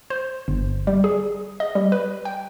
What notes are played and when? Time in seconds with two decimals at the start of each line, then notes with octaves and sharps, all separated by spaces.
0.10 C5
0.48 G1
0.87 G3
1.04 G#4
1.60 D#5
1.75 G3
1.92 B4
2.25 G5